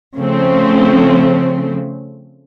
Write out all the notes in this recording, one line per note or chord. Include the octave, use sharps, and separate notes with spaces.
C#3 F3 A3 C4